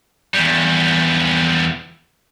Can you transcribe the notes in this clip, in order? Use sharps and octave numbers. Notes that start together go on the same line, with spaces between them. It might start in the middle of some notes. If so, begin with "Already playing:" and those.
E2 G3